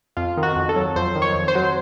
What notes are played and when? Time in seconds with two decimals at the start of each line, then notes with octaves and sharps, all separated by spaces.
0.17 F2 F4
0.37 D#3
0.43 F#4
0.56 F2
0.69 A4
0.76 F#3
0.96 F2 C5
1.15 D#3
1.22 C#5
1.35 F2
1.48 C5
1.55 F#3